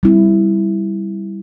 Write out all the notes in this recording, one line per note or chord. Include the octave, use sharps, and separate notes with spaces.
G3 C4 E4